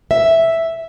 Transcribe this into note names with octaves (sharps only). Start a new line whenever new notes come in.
E5